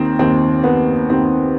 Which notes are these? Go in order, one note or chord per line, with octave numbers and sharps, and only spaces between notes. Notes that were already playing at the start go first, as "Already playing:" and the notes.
Already playing: D#2 D#3 C4
D#2 D#3 C4
B3
D#2 D#3 C4